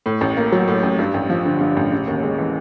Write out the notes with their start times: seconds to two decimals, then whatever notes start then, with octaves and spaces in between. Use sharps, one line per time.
0.06 A2
0.21 A1
0.37 A#3
0.52 F#3
0.68 A2
0.83 A1
0.99 G2
1.14 A1
1.30 F3
1.45 D3
1.61 G2
1.77 A1
1.92 C#3
2.07 D#2
2.23 G#3
2.38 E3